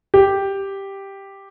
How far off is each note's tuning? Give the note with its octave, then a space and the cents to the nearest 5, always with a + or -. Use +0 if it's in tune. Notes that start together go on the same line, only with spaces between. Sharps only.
G4 +0